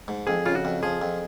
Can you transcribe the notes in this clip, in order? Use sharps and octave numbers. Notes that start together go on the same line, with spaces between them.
G#2
F2 G#4
C#3 F4
F#4
F2
F3 G#4
F2